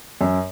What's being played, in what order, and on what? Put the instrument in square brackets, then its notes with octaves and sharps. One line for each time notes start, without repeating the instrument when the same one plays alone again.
[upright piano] F#2